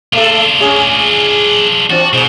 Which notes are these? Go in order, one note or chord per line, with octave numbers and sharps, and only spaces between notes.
A3 D4 F4 A4
G#3 C#4 G#4
E3 C4 D4 F#4
G#2 B2